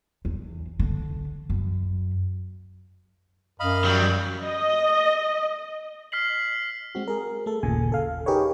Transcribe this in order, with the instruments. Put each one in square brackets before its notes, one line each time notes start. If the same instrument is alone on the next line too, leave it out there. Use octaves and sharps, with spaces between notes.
[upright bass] E2
D3
F#2
[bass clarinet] F#2 [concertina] D#5 F5 B5
[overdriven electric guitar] F#3 G3
[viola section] D#5
[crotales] F6 B6 C7 F#7
[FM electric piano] G#3 C4 F#4
G#4 A#4
A3 A4
G1 D#2 A#2 C#3 G#5
A4 F5
D#4 G4 G#4 A#4 B4 C#5